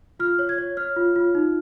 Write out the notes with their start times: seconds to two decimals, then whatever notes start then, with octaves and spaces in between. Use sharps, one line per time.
0.19 F4 F6
0.39 C#5
0.49 G#6
0.58 C#5
0.77 C#5 F6
0.96 F4
1.16 F4
1.35 D#4